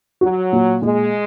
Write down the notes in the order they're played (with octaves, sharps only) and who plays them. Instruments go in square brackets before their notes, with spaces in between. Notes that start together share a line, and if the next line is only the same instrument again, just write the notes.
[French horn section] F#3 [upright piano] F#4
[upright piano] A#2
[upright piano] A#2 [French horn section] G#3